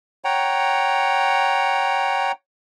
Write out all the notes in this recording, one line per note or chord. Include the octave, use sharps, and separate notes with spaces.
C#5 F#5 G5 A#5